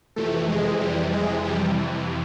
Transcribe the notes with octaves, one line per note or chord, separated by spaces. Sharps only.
F2 C3 E3 A3
G#3
G3
G#3
G3